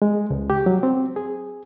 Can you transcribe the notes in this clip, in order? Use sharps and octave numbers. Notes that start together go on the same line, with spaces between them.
G#3
C#2
G4
F#3
C4
G#4